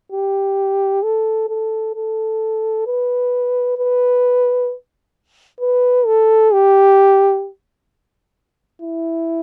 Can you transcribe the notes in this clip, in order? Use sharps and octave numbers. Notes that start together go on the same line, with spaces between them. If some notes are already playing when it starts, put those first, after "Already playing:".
G4
A4
A4
A4
B4
B4
B4
A4
G4
E4